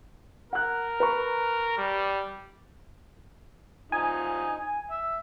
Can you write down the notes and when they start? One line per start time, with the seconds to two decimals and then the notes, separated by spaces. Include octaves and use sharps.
0.53 A#4 F#5 F#6
1.00 B4 A#5 C#6
1.78 G3
3.92 F3 D#4 G#5
4.91 E5